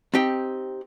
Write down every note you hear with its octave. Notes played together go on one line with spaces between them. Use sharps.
C4 D#4 G4 G5